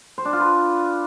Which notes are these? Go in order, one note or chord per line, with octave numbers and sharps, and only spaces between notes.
C5
D4
F4
B4